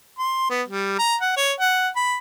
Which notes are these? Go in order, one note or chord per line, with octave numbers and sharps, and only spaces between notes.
C6
B3
G3
A#5
F#5
C#5
F#5
B5